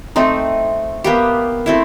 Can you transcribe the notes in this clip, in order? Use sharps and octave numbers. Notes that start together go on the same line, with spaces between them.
A3 C4 D#4
A#3 B3 G4
A3 C4 E4